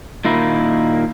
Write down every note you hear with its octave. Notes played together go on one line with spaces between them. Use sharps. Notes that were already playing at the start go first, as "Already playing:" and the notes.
A#2 D#3 A#3 E4